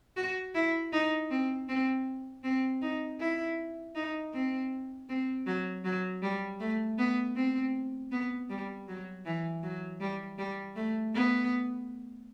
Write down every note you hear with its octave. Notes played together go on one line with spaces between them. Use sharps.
F#4
E4
D#4
C4
C4
C4
D#4
E4
D#4
C4
C4
F#3
F#3
G3
A3
B3
C4
B3
G3
F#3
E3
F#3
G3
G3
A3
B3